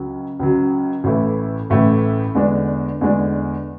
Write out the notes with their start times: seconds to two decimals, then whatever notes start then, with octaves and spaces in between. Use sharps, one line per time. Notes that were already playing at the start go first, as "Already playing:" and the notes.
Already playing: C#2 C#3 F#3
0.39 C#2 C#3 F#3
1.04 A1 A2 E3 A3 E4
1.70 A1 A2 E3 A3 E4
2.35 E2 D3 G#3 D4
3.01 E2 D3 G#3 D4